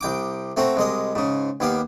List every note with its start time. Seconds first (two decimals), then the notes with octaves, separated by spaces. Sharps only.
0.01 C2 G5 D6
0.57 A3 C4 F#4 A#5
0.77 C2 G#3 D#5
1.15 G#2 C#3
1.60 D#2 B3 G4 F5